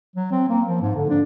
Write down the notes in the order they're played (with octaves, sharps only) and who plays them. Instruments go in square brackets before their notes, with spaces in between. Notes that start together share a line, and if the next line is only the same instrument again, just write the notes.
[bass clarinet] F#3
C4
A#3
F3
G#2
D3
D4